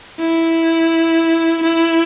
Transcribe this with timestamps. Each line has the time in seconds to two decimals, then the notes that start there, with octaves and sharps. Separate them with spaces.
0.19 E4
1.63 E4